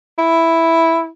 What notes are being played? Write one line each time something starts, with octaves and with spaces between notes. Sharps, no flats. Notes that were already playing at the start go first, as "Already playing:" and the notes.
E4